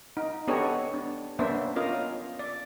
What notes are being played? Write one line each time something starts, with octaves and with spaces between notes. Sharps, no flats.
D#4
B3 D4 G4 A4 C#5 D#5
D4
A#3 B3 C#4 D4 C5 E5
C#4 F4 A#4 D#5 F5
D5